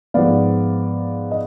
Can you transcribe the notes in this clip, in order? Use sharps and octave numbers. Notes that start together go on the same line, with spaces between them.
G#2 F3 B3 D5 F5
D#5